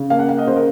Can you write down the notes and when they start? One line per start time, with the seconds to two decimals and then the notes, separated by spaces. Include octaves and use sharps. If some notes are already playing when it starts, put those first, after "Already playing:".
Already playing: C#3
0.10 A#3 F5
0.19 F#5
0.28 A#3 F5
0.38 D#5
0.47 C#3 C5
0.56 A#4